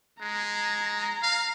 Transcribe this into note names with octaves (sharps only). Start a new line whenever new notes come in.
G#3 A#5
F5